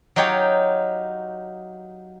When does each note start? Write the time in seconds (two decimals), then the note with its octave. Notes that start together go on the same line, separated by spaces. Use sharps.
0.16 F#3 D#4 F4 G4 C#5 G5